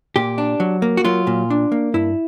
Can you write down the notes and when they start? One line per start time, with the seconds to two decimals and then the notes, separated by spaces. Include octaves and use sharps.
0.16 A#2 G4
0.38 D4
0.60 F#3
0.82 A#3
0.97 F#4
1.05 F#3 F4
1.27 A#2
1.50 D4
1.72 A#3
1.94 G2 E4